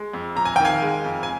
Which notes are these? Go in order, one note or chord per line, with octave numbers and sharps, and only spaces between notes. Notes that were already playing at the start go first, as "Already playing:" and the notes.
Already playing: G#3
F2
F2 A#5
G#5
D#3 G5
F5 G#5
G#3
F2
G#5